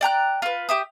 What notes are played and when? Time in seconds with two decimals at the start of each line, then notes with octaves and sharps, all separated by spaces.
0.01 D5 G5 A#5 F#6
0.42 F4 B4
0.69 G4 E5 D#6